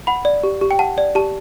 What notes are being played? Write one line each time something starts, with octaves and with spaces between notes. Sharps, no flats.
F#5 B5
D5
G4
G4
G5
F#5 A5
D5
G4 A5